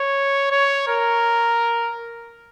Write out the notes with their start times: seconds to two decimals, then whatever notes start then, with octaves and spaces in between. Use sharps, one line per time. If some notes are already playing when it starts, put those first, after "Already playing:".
Already playing: C#5
0.52 C#5
0.88 A#4